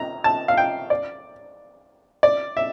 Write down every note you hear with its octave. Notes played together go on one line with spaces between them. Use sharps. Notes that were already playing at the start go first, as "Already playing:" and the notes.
Already playing: A#5
A5
F5
G5
D5
D5
E5